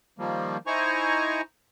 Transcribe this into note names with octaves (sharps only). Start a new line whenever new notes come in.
D#3 F3 G3 A#3
D#4 E4 C5 G#5 A#5 C#6